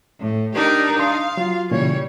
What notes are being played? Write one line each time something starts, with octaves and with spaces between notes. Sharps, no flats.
A2
D4 D#4 G4 A#4
F5 C6 D#6
F#3 F4
A#2 C#3 E3 G3 C#5